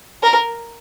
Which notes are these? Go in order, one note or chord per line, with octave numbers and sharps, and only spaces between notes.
A#4